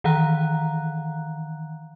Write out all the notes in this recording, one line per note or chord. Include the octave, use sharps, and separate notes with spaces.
D#3 E3 F5 F#5 A#5 F#6